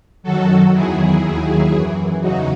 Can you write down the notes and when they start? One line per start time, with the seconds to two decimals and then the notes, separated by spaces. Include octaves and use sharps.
0.23 F#2 D#3 F#3 F#4 A4
0.72 E2 D#3 F#3 E4 G#4
1.22 D#2 D#3 F#3
1.72 F#2 E3
2.21 E2 C#3 F#3 D#4 F#4